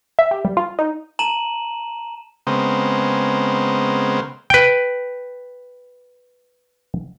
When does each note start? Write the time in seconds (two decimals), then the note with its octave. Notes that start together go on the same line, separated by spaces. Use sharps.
0.19 E5
0.31 G4
0.45 G3
0.57 F4
0.79 D#4
1.19 A5 A#5 D#7 E7 F#7
2.47 C#3 G#3 B3 C4 A#4 C5
4.50 B4 G5